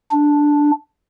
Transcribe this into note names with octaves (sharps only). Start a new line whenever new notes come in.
D4